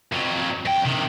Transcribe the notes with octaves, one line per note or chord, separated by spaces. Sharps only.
F2 F#3
F2 G5
C3 D#3